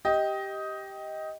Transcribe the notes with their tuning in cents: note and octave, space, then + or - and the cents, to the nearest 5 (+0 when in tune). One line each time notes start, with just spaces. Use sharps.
G4 -5 D#5 +15